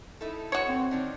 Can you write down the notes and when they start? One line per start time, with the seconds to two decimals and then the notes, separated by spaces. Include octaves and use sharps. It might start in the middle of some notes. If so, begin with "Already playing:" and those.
0.21 D#4 E4 A4
0.52 F#4 C#5
0.68 C4
0.91 D#3 D4 D#4